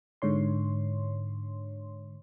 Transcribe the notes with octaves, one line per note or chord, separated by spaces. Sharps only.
G#2 D3 C#5 C6